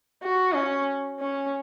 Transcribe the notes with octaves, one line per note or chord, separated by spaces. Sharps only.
F#4
C#4
C#4